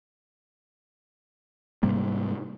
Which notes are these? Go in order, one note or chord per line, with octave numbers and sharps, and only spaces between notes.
G#2 C3 G3 A#3